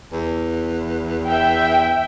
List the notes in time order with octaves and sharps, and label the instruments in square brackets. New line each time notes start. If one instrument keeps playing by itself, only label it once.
[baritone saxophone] E2
[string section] E5 G5